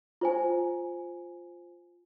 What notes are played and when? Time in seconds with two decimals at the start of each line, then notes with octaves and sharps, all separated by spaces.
0.21 F4 C5 G#5